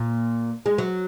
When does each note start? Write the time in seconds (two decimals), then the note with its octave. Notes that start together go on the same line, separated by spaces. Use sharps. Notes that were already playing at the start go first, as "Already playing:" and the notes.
Already playing: A#2
0.66 G#3
0.78 F#3